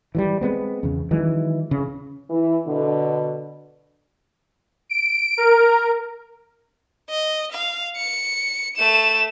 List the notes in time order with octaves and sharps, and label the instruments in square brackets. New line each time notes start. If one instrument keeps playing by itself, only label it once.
[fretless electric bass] E3 F#3 G3
G#3 B3 C4
E2 C#3
D#3 E3 F#3 G#3
C#3
[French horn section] E3
B2 D3
[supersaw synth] D7
A#4
[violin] D#5
F5
C#7
A3 E7